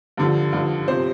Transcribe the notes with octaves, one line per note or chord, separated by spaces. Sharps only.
G2 D3 F3
G2 D3 F3
C3 F3 C5